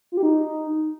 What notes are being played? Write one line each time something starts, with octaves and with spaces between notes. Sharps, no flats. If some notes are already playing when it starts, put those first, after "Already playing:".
F4
G4
D#4